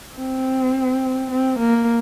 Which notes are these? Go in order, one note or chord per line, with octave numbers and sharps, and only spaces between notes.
C4
C4
A#3